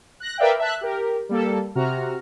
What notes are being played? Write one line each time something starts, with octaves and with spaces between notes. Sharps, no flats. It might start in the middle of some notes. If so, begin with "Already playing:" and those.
F#6 A#6
A#4 B4 D5 E5 F5 G5
E5 A5 F#6
G4 A#4
G3 A#3 A4
C3 F#4 A#5 F6